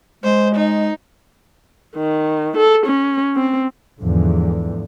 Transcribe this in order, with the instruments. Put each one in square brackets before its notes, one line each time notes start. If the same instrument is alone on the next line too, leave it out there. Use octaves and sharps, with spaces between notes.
[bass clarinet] G#3 [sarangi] C5
[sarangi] D#4
[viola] D#3
A4
C#4
C4
[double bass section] E2 G#2 D3 F3